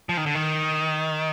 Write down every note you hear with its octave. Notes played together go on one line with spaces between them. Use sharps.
F3
D#3
D3
D#3